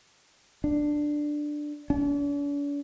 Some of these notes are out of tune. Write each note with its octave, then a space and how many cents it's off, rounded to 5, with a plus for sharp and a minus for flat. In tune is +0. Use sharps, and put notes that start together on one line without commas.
D4 +10
D4 -45